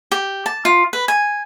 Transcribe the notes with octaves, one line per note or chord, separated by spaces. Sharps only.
G4
A5
F4
B4
G#5